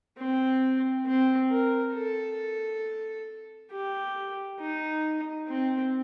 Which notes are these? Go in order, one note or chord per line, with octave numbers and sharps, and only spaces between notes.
C4
C4
A#4
A4
G4
D#4
C4